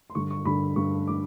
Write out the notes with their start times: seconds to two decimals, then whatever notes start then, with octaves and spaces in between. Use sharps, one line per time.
0.10 C6
0.15 G2 D3 C#6
0.31 C#6
0.45 G2 D3 B5
0.76 G2 D3 C#6
1.07 D3 D6